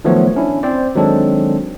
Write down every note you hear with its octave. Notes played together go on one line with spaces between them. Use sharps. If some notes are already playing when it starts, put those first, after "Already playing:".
D#3 F3 F#3 A3 B3 C#5
C#4 D4 E4
C4 C5 D5
D#3 F#3 G#3 C4 D4 A4